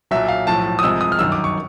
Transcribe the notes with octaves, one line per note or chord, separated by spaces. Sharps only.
B1 A#2 F#3 E5
F5
B1 A2 F3 A5
D#6
C2 C3 F3 G#3 E6
D#6
F6
G1 F#2 D#3 E6
D6
C#6